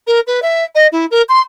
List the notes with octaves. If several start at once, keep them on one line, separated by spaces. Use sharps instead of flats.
A#4
B4
E5
D#5
E4
A#4
C6